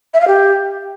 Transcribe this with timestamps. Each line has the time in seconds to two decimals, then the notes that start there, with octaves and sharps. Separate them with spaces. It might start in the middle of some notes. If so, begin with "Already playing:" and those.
0.14 E5
0.21 F5
0.27 G4